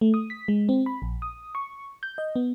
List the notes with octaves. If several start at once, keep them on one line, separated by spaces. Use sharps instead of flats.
A3
D#6
B6
G#3
C4
B5
A#1
D#6
C#6
G6
D#5
B3